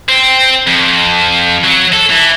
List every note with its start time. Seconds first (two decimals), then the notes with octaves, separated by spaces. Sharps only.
0.09 C4
0.67 F2
1.64 F#3
1.93 A4
2.10 E3